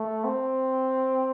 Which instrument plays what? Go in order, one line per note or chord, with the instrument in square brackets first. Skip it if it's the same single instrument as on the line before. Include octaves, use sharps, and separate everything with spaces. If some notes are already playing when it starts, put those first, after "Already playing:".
Already playing: [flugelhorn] A3
C4